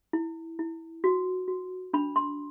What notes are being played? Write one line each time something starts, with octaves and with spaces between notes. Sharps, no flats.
E4
E4
F#4
F#4
D4 B5
C6